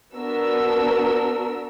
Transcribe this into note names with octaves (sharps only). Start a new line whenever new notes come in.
B3 D4 F#4 A#4 E6